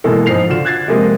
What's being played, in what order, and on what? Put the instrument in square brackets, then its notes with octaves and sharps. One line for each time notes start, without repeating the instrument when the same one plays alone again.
[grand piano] B2 E3 G#3 A#3 A4
G#2 F3 D#4 C7 F7
D3 F4 F#4 E7
F#6 G#6 A6 C7
C3 F3 G#3 A#3